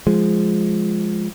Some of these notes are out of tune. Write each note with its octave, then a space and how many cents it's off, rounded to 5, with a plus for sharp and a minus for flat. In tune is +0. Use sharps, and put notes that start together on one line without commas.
F3 +0 G#3 +0